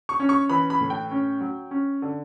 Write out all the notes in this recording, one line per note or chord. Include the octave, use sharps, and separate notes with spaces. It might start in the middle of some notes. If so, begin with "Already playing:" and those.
C#6
C#4
C#6
E3 B5
B5
A2
G5
C#4
F#3
C#4
D3